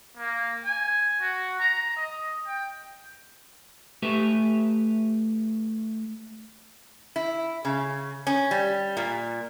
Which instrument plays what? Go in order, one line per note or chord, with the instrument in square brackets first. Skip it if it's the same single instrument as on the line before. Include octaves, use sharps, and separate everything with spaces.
[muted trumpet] A#3
G#5
F#4
A#5
D#5
G5
[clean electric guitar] A3 G4 B4 E5
[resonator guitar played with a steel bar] E4
C#3
C#4
G3
A#2